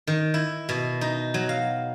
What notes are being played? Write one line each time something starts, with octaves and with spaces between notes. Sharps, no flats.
D#3
E4
B2
D#4
F#3
F5